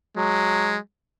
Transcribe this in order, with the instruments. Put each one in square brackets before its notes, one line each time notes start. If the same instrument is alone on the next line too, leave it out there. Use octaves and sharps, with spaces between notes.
[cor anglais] F#3 [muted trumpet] G#3